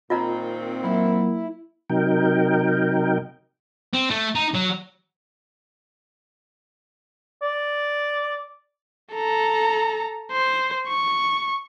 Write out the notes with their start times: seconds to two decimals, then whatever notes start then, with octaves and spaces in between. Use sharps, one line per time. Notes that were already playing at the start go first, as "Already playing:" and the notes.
0.10 A#2 D#3 C4 F4 D#5 A#5
0.83 F#3 A#3 E4 A#4
1.90 C3 F#3 D#4 A#4 G5
3.94 C4
4.10 A3
4.35 D#4
4.54 F#3
7.42 D5
9.14 A4 A#5
10.32 C5
10.88 C#6